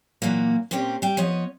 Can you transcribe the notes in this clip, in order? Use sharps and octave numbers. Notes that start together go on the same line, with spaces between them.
A#2 E3 F#3 A#3
A#2 A#3 C4 C#4 G4
G3 G5
F3 B3 C#5 D#5